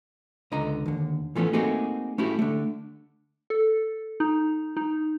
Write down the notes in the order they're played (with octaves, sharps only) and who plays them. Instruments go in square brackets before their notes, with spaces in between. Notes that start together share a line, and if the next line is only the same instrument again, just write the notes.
[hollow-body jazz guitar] C#2 D3 D#5 A#5
D#2 D3
E3 F3 A3 B3 C#4
A3 A#3 C4 D#4 F#4 G#4
A3 C#4 E4 F#4 G4
D3 A3
[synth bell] A4
D#4
D#4